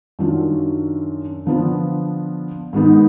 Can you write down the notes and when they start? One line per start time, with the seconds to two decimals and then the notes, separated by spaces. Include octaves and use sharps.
0.19 F#2 D#3 F#3 D4 F4
1.46 D3 F3 B3 D4 F4
2.73 G#2 D#3 G#3 B3 D#4